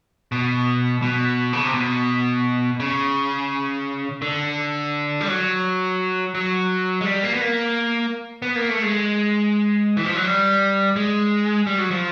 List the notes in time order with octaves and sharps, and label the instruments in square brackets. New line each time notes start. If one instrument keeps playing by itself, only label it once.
[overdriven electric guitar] B2
B2
C#3
C3
B2
C#3
D3
G3
F#3
F#3
G#3
G3
A#3
B3
A#3
B3
A#3
A3
G#3
E3
F3
F#3
G3
G#3
G3
F#3
F3